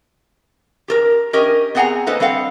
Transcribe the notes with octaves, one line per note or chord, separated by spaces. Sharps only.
G4 A4 A#4
C#4 G4 A#4 D#5
B3 C4 G#4 F#5 G#5 A#5
A#3 A4 B4 C5 D#5
G3 C4 A4 F5 F#5